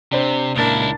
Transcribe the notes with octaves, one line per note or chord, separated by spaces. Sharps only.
C3 D4 C5
C#2 A#2 D4 E4 A#4 A6